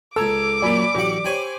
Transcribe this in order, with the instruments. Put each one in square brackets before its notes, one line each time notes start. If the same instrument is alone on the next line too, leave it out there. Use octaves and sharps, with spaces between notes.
[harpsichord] C#2 A#5 [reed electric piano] A4 [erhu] D6 [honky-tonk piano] E6 G#6
[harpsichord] F#2 A#2 F#3 [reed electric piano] D5 [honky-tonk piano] G#5 B5 B6
[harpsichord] A1 F#5 [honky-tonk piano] F#3 G4
[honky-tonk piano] G4 C#5 [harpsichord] C5 G#5 B5